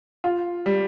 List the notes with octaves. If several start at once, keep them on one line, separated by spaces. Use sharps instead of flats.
F4
G3